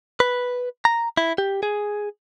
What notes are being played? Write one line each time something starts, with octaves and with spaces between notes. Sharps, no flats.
B4
A#5
E4
G4
G#4